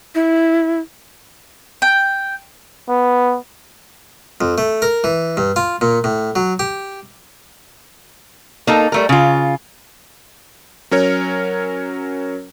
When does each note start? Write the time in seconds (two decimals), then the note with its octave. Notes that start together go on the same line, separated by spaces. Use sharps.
0.15 E4
1.82 G5
2.89 B3
4.41 F2
4.58 A3
4.82 A#4
5.04 E3
5.37 G2
5.56 F4
5.81 A#2
6.04 A2
6.36 F#3
6.59 G4
8.67 A#3 D#4 A4
8.92 G3 A3 A#4
9.09 C#3 F4
10.91 F#3 C#4 A#4 C#5